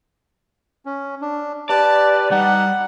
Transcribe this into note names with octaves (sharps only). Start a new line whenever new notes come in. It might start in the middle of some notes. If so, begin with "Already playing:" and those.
C#4
D4
G4 B4 D5 A5
G3 D#4 F#5